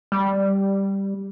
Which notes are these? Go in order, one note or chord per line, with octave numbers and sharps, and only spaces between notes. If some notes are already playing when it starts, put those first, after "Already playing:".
G3